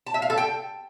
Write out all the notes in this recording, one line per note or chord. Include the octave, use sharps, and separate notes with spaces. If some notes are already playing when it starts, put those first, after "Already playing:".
A5
E5
F5
A4
G5